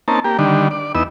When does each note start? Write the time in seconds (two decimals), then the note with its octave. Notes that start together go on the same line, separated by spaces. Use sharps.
0.08 A#3 C4 C#4 D#4 A5
0.24 A#3 G4
0.39 D3 D#3 G3 D4
0.71 D5
0.95 E2 B3 D#4 E6